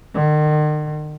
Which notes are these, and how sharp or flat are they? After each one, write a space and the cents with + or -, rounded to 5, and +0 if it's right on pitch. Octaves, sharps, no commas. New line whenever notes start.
D#3 -45